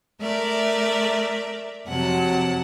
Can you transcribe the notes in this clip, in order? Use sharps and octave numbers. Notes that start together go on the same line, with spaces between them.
A3 A#4 D5 E5
F2 C3 F#3 F#5 A5